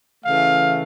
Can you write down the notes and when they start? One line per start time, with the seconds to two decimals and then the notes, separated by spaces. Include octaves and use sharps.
0.25 C#3 E3 A3 F5